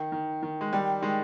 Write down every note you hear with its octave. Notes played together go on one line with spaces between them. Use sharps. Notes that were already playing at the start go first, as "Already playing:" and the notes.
Already playing: D#3
D#3
D#3
G#3
D#3 G3
D#3 G#3